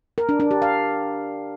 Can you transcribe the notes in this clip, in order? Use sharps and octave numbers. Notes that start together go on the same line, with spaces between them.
A#4
D4
D4
G4
F5